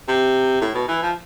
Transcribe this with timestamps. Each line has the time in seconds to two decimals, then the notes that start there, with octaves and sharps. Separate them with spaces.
0.08 C3
0.61 A2
0.75 B2
0.88 E3
1.03 F3